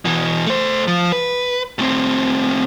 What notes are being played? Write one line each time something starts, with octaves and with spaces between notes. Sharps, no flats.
B2 E3
A3 C5
F3
B4
A2 C4